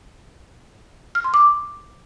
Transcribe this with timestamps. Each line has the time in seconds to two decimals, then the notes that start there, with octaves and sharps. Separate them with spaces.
1.15 F6
1.24 C6
1.34 D6